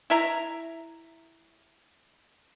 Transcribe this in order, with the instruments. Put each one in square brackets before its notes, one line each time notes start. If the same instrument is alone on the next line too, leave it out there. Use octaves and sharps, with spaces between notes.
[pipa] E4 E5 A#5